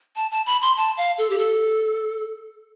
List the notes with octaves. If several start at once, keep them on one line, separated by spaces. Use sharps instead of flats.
A5
A5
B5
C6
A5
F5
A4
G4
A4